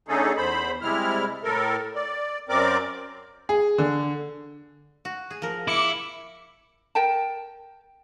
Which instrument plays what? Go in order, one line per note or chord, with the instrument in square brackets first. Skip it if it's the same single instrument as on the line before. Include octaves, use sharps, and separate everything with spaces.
[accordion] D3 A3 C#4 D#4 G#4 A4
E2 C5 B5
C3 G3 G#3 E4 F6
A2 A4 A#4
D5
F#2 C4 A#4 D5 D6
[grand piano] G#4
D3
[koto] F#4
G#4
F3 A#4
[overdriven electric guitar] E4 [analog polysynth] D6 C#7
[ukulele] A#4 G5 A5